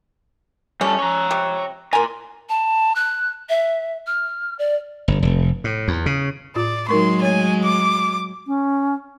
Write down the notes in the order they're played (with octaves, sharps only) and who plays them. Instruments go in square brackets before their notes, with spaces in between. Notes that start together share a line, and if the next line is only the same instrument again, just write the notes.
[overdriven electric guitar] G3 A4 [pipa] C#4
[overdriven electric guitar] C#5 A#5
[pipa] C3 G3
[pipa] A#4 G#5 [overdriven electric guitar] A#5 C6
[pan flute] A5
F#6
E5
F6
D5
[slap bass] G1
F1
A2
E2
C#3
[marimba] A2 F4 [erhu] D5
[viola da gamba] F#3 G#3 [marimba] D#4 A#4 C#6 [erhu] C6
[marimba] A3 C#5 [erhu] G#5
[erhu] D6
[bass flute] C#4